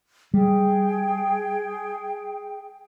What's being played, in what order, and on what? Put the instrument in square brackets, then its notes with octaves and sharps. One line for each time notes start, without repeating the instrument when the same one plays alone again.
[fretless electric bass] G3 [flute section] G#4 G5